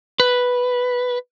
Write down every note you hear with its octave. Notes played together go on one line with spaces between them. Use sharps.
B4